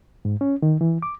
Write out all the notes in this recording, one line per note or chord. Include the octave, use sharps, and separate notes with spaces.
G#2
C#4
D#3
E3
D6